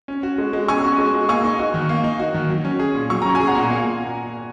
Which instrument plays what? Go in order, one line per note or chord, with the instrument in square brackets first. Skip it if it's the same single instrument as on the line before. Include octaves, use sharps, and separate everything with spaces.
[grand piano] C#4
F#4
G#3
G#3
[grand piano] C#4 [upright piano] G#5 C#6
[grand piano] F#4
G#3
G#3
[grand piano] A#3 [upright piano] G#5 C#6
[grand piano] D#4
F#4
D#3
A#3
D#4
F#4
D#3
F#3
C#4
G#4
A#2
[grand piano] F#3 [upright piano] C#6
[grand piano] C#4 [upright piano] A#5
[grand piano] G#4 [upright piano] G#5
[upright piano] F#5 A#5
[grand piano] A#2
A#3